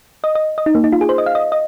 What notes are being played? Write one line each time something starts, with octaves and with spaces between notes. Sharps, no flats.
D#5
D#5
D#5
D#4
A#3
D#4
F4
G#4
C5
D#5
F5
D#5
D#5